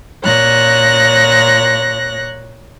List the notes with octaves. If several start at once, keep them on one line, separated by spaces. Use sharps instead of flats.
A#2 C#5 F#6 A#6